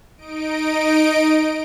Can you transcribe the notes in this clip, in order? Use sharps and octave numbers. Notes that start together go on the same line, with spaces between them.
D#4 D#5 D7